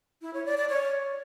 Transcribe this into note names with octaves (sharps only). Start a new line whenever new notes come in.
E4
C#5
D5
D5
C#5